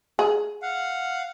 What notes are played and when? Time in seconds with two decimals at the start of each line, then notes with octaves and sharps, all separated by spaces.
0.19 G#4
0.62 F5 F#5